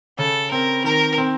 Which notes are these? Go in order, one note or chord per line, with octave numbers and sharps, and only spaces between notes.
C#3 A4
C4 A#4
D#3 A#4
C4